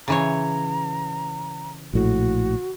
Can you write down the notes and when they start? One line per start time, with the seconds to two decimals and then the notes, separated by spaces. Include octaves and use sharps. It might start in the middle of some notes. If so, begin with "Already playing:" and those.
0.08 C#3 E3 C#5 A#5
1.94 A#1 A2 F#4